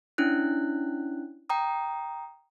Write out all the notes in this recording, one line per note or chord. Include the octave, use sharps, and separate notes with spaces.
C#4 D4 E4 F#6
G5 A#5 D#6